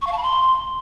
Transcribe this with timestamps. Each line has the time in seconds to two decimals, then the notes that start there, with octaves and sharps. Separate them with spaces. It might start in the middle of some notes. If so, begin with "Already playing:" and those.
0.02 C#6
0.07 F5
0.12 A5
0.18 B5
0.23 C6